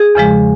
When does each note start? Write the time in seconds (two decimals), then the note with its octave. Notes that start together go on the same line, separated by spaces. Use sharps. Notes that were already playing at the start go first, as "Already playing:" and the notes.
Already playing: G#4
0.15 E2 C#3 F3 G#3